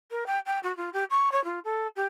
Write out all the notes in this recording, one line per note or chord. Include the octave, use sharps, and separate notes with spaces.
A#4
G5
G5
F#4
F4
G4
C#6
C#5
F4
A4
G4